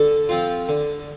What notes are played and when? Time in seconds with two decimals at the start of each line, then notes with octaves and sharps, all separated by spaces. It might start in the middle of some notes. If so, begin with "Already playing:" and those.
Already playing: D3 A4
0.29 F3 C4 F4
0.68 D3